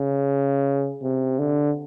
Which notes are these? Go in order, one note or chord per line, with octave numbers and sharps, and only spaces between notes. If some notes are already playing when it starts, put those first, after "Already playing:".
Already playing: C#3
C3
D3